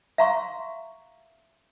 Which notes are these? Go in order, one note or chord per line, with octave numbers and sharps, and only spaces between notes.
E5 F5 A#5 C6 C#6